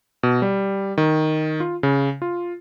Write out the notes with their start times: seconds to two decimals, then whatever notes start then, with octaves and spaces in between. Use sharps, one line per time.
0.23 B2
0.42 G3
0.98 D#3
1.60 F4
1.83 C#3
2.22 F4